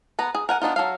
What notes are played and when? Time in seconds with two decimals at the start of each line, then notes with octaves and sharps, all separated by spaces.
0.19 B3 B4 A#5
0.35 G#4
0.49 A#4 F#5 G#5
0.62 B3 D4 D#4 F4
0.76 F#3 A4 F5